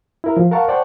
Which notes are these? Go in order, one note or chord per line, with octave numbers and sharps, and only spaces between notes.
E4 A#4
F3
A#4 F5 F#5 A5 C#6
C5 D5 F#5 G5 A5 C#6